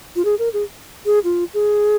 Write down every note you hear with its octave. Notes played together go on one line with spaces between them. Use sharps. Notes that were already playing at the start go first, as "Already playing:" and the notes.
F4
G#4
A#4
G#4
G#4
F4
G#4